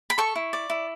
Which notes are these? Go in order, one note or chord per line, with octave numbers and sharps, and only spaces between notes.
B5
A4 C#6
E4
D5
E4